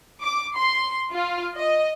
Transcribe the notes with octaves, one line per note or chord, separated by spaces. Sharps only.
D6
C6
F4
D#5